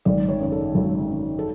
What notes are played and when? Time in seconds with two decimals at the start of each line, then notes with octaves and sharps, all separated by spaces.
0.05 G#1 D5
0.29 C#5
0.41 F#2 C#3
0.52 A4
0.75 G#1 F#4
1.10 F#2 C#3
1.39 A4